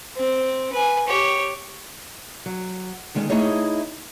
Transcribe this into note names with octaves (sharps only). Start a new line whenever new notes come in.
C4
B4 G#5
G4 C#5
F#3
D3 D#3 G#3 C#4
A3 D#4 E4 G#4 C#5 D#5